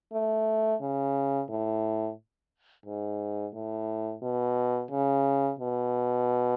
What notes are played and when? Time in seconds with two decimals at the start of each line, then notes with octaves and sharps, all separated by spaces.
0.13 A3
0.81 C#3
1.49 A2
2.86 G#2
3.54 A2
4.22 B2
4.90 C#3
5.59 B2